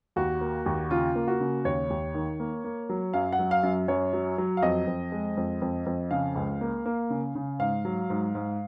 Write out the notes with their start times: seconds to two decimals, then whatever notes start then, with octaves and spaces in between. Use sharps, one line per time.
0.16 D#2 F#4
0.41 A#3
0.66 D#2
0.90 C#3 F4
1.15 A#3
1.28 F#4
1.40 C#3
1.65 D#2 C#5
1.90 D#2
2.14 D#3
2.40 A#3
2.64 A#3
2.89 F#3
3.13 F#2 F5
3.32 F#5
3.39 F#3
3.51 F5
3.63 F#2
3.88 F#2 C#5
4.13 F#3
4.38 F#3
4.57 F5
4.62 F2 D#5
4.87 F2
5.12 G#3
5.37 F2
5.62 F2
5.86 F2
6.11 C#3 F5
6.36 C#2
6.61 A#3
6.86 A#3
7.10 C#3
7.35 C#3
7.59 G#2 F5
7.85 F#3
8.10 G#2
8.35 G#2